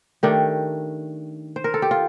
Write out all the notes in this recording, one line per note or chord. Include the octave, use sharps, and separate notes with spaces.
D#3 A3 D4 G4
C5
A#4
A4
G4
F4